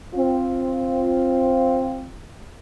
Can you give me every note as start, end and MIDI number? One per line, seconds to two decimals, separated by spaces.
0.14 2.10 60
0.14 2.10 65